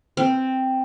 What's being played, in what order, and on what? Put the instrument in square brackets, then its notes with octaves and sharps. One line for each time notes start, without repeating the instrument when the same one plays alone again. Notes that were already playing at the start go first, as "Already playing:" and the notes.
[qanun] C4